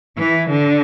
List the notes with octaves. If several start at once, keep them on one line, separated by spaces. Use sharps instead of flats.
E3
D3